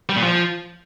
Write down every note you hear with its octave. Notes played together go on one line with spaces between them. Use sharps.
G3
A#2
F3